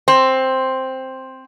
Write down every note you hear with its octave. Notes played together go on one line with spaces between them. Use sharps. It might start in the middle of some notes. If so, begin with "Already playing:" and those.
C4